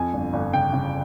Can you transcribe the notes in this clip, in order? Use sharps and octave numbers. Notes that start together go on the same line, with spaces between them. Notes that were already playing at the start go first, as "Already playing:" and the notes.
Already playing: F2 G#5
G1
G1
C#3 G5
C#3